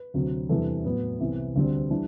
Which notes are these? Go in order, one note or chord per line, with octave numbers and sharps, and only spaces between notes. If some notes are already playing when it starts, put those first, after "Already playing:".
Already playing: B4
D2 C3 F#3 C4
E2 C3 E3 G3 D4 A4
A2 F#3 B3 B4
C2 C3 E3 B3
D2 D3 G3 C4
E3 G3 D4